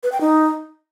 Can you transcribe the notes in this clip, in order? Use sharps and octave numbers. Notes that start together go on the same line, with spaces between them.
B4
G5
D#4